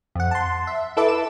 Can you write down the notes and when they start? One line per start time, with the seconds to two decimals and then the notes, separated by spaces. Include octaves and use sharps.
0.15 F2 F#5
0.31 A5 C6
0.67 E5
0.97 E4 A4 B4 E5 A5 D6
1.08 E7